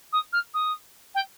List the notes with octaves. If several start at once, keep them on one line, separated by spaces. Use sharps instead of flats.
D#6
F6
D#6
G5